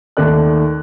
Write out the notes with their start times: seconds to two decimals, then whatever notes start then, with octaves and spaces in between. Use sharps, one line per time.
0.17 D#2 D#3 A3 D5 F#6